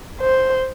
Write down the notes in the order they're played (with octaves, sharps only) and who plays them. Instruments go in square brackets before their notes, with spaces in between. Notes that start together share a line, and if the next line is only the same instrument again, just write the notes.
[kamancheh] C5